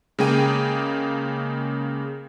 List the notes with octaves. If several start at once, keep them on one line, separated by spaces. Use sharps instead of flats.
C#3 G#3 A#3 G#4 G5 D#7